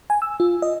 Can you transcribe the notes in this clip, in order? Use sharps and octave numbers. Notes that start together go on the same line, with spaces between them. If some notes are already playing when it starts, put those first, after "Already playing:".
G#5
E6
F4
D#5